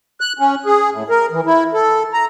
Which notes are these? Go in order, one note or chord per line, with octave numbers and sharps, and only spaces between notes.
F#6
C#4
G#4
A2
A#4
E3
E4
A4
A#5